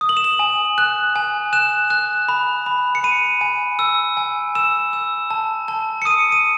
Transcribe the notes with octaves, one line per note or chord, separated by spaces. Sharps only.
D#6
F#7
E7
F#7
G#5
F#6
G#5
F#6 E7
F#6
B5
B5
C#7
B5 D#7
G#5
E6
G#5
E6 E7
E6
A5
A5
C#7
D#6 D#7
D#7